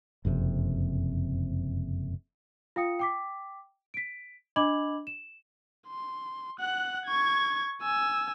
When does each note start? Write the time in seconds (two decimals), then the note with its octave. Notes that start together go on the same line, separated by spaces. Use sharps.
0.25 F#1 F2 G#2 C3
2.76 F4 F5 G5 D#6 C#7
2.99 G5 D6 B6
3.94 B6 D7
4.56 D4 D#5 B5 D6 G#6 F#7
5.07 E7
5.87 C6
6.59 F#5 F#6
7.06 C#6 G#6
7.82 G#5 E6